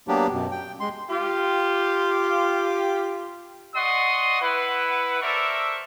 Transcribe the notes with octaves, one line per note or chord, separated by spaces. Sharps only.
F#3 A#3 B3 D4 G4
F#2 B2
G5
G#3 C6
F4 G4
D5 D#5 F#5 C6 C#6 D#6
E4 B4 F#5
A4 A#4 C5 D5 E5 C#6